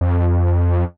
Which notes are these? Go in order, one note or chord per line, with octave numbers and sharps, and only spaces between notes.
F2